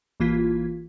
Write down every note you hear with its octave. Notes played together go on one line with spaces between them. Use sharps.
A1 E3 A#3 F4 G#6 B6